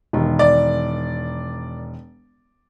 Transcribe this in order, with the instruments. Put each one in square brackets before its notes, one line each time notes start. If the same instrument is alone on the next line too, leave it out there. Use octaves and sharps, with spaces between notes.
[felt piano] E1 D#3
[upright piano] D5